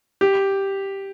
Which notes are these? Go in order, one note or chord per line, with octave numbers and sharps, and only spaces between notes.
G4